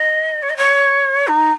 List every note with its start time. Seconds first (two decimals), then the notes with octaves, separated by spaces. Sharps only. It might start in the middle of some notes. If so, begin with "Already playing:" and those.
Already playing: D#5
0.42 C#5
0.49 D#5
0.57 C#5
1.27 D#4